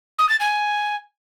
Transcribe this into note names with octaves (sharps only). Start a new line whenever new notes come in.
D#6
A6
G#5